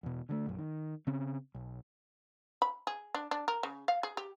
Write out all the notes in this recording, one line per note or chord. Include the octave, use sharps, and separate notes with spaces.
E2 B2
D3 G3 A3
A#1 F#2
D#3
C#3 C4 C#4
B1
B5
G#4
D4
D4
A#4
C#3
F5
G#4
G4